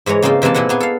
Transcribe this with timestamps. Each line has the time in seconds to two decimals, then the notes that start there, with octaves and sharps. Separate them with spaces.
0.06 G#2 E3 G#3 C#5 A#5
0.22 C#3 A#3 C4 D#4 F4
0.42 C3 E3 G#3 A#3 A5
0.54 A#2 D4 E4 D#5 F#5
0.69 A#3 B3 G#4
0.80 A4 F5